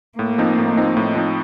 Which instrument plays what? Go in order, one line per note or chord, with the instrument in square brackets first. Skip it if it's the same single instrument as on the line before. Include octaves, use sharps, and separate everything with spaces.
[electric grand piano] A2 [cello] A#3
[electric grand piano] F3 C4 D#4
A2
F3 C4 D#4
A2
F3 C4 D#4